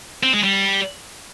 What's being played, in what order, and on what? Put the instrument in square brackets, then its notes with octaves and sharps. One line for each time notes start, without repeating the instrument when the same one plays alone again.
[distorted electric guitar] C4
G#3
G3